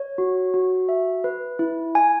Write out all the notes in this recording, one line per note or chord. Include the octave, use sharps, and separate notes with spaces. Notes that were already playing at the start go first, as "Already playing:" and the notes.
Already playing: C#5
F#4
F#4
E5
B4
E4
G#5